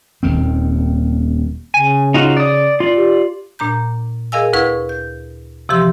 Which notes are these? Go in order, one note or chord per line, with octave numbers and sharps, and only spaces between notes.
D#1 D#2 D#3 C4
C#3 G#5
D#4 F4 F#4
D5 D#6
F4 D5
G4
A#2 D4 A#5 G6
G#4 A#4 D#5 F5 G#5 E6
D2 E4 B4 F5 C#6 G#6
G6
C3 E3 F3 G4 C6